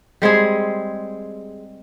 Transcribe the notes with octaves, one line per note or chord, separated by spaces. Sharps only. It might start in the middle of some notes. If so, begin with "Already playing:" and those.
G3 G#3 C4 G#4